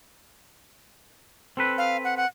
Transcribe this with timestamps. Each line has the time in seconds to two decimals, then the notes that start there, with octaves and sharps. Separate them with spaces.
1.57 C4 A4 B4
1.78 F5
2.04 F#5
2.17 F#5